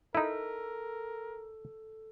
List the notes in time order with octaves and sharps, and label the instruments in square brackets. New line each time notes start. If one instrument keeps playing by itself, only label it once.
[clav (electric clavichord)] D#4 E4 [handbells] A4 [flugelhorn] A#4